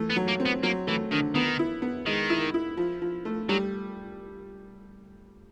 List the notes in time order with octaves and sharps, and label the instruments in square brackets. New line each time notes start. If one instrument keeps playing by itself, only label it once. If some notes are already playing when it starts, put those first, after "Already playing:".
Already playing: [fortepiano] E3 A3
[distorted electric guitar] B3
[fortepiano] F#3
[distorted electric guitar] A#3
[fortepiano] C4
[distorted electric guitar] B3
[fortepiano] F#3 [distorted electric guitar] A#3
[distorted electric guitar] E3 [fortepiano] A3
[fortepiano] D3 [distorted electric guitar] D#3
[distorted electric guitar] D#3 [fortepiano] B3
[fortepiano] E4
B3
[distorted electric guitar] D#3 [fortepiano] G#3
[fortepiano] E4
E4
F3
F3
A3
[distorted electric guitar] F#3 [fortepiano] G3